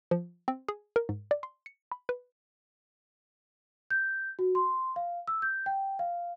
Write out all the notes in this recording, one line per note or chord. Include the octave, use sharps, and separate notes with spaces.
F3
C4
G#4
A#4
G#2
D5
C6
C#7
B5
B4
G6
F#4
C6
F5
E6
G6
G5
F5